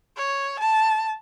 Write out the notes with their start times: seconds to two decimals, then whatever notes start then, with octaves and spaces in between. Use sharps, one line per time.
0.16 C#5
0.59 A5